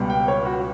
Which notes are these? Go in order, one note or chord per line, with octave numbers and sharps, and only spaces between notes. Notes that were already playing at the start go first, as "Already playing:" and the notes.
Already playing: C#2 B2 G3 B3
G5
C#5
F#4